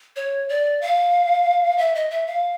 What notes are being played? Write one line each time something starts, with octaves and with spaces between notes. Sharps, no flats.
C#5
D5
F5
E5
D#5
E5
F5